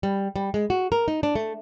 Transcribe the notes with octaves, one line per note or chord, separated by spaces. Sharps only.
G3
G3
G#3
F#4
A#4
D#4
D4
A3